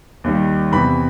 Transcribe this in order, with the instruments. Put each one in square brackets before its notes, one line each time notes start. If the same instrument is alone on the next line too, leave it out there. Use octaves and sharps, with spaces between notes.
[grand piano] D#2 D#3 G3
E2 C3 E3 B5